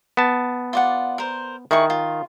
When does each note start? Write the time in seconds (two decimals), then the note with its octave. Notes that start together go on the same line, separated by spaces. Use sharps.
0.17 B3 A5
0.73 F4 D5 F#5
1.18 A#4 C5
1.71 D#3 E4 G#4 C#6
1.90 F4